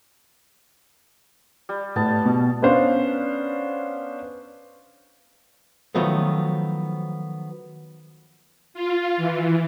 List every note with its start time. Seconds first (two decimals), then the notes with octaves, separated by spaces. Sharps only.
1.69 G3
1.96 A2 G3 B3 A5
2.25 B2
2.62 B3 C#4 D4 C5 F5
5.95 D#3 F3 F#3 A3 B3
8.74 F4
9.17 E3